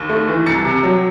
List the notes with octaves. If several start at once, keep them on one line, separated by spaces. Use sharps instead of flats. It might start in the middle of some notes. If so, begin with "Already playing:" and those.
Already playing: D#2
A3
E3
C2 A6 C#7
C3
F#3